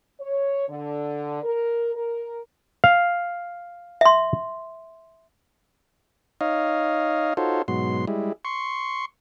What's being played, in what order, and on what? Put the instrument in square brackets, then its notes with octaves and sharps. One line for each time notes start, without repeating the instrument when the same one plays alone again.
[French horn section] C#5
D3
A#4
A#4
[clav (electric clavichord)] F5
[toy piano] E5 C6
[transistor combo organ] D#4 C#5 D#5 F5
D#4 F4 F#4 A4 C5 C#5
G#2 B2 F#3 C6
G3 G#3 E4
C6 C#6